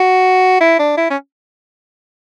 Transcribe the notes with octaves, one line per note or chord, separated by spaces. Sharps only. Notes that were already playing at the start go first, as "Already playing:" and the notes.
Already playing: F#4
E4
D4
E4
C#4